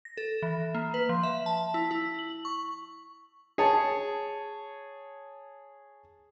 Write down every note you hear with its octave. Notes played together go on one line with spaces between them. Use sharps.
A#6
A4
E3
A#3
B4
F3
E5
A5
E4
E4
F#7
C#6
G#4 C#5 A5